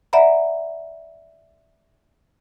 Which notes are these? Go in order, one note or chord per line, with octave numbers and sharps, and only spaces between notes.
D5 E5 F#5 A#5 B5